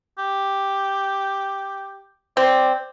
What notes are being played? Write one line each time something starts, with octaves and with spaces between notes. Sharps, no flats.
G4
C4 D5